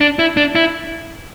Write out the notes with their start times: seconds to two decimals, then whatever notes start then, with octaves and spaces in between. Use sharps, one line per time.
0.01 D4
0.19 E4
0.37 D4
0.55 E4